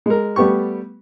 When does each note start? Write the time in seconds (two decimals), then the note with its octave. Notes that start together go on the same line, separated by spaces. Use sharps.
0.06 G#3 A#4
0.36 G3 A3 B3 G4 C#6